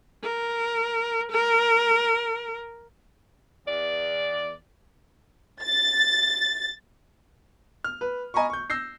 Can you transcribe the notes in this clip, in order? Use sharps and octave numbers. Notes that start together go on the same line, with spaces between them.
A#4
A#4
E2 D5
A6
F6
B4
D#5 G#5 A#5 B5 C#6
C#6 G6
E6 G6 A#6 C7